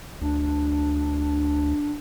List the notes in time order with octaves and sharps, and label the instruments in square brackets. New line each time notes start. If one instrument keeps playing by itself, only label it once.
[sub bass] D2 [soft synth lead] D4